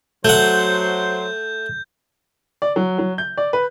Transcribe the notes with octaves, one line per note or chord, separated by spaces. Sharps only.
F#3 A3 C5 F#5 G6
D5
F#3
F#3
G6
D5
B4